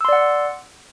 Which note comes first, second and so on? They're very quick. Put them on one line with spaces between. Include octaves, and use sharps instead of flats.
E6 C6 D5 F#5